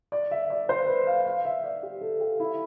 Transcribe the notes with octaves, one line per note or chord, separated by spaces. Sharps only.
D5
E5
D5
C5
B4
F5
F5
E5
D5
G4
A4
G4
E4